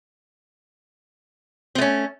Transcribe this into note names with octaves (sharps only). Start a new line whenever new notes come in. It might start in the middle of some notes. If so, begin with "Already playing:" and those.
A3 C4 C#4